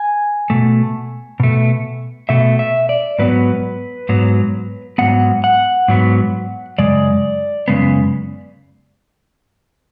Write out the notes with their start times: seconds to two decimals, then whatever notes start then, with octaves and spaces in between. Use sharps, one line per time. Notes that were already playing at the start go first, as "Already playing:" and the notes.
Already playing: G#5
0.50 B2 A3
1.40 B2 A3
2.29 B2 A3 E5
2.59 E5
2.89 D5
3.19 G#2 F#3 B3 B4
4.09 G#2 F#3 B3
4.98 G#2 F#3 B3 F#5
5.44 F#5
5.88 G#2 F#3 B3
6.78 F#2 C#3 G#3 D5
7.68 F#2 C#3 G#3 B3